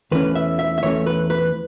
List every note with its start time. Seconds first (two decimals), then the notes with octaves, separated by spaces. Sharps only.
0.11 E2 E3 A3 C#4 B4
0.35 E5
0.59 E5
0.78 E5
0.82 E2 E3 A3 C#4 C#5
1.06 B4
1.30 B4